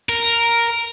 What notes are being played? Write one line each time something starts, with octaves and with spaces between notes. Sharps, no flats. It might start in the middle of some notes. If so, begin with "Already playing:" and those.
A#4